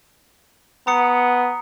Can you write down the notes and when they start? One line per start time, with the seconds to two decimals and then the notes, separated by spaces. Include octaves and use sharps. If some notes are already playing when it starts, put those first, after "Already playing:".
0.87 B3 A#5 D#6 C#7